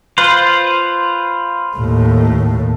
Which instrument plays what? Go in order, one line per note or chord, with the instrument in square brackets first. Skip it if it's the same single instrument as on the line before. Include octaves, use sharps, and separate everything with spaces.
[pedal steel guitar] F4 B4 C5
[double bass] D#2 A2